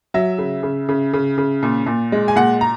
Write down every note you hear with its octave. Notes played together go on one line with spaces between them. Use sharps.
F#3 E5
C#3
C#3
C#3
C#3
C#3
A#2
A#2
G#3
G#5
A#2 F#5
A#5